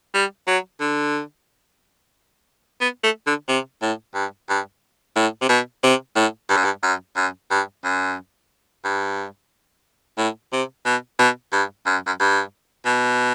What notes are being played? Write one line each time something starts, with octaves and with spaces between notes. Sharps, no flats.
G3
F#3
D3
B3
A3
D3
C3
A2
G2
G2
A2
C3
B2
C3
A2
G2
F#2
G2
F#2
F#2
G2
F#2
G2
A2
C3
B2
B2
G2
F#2
F#2
G2
B2